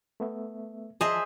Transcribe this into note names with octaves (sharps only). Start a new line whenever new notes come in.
A3 B3 E5
F3 G#4 C5 D#5 E5 A5